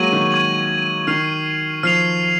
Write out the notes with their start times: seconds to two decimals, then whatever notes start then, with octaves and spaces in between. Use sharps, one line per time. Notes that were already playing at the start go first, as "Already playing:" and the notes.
Already playing: F#3 G#3 A#3 C#6 G#6 D#7 F#7
0.13 D#3
0.32 C#6 G#6 D#7 F#7
1.07 D#3 F6 C7 F7
1.83 F3 F6 C7 F7